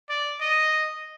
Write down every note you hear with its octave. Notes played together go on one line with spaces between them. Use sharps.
D5
D#5